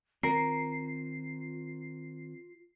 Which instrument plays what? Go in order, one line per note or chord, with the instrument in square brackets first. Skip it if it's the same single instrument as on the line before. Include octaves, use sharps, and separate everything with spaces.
[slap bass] D#3 C4 [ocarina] F4 [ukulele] A#4 [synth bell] C7